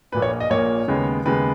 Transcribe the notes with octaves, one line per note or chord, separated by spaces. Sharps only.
A#1 A#2 A#3 B4
C#5
D#5
A#1 A#2 A#3 C#5
D#2 C#3 G#3 B3
D#2 C#3 G#3 B3 B4